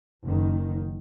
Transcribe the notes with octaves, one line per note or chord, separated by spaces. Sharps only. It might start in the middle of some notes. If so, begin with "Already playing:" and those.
F#1 D#3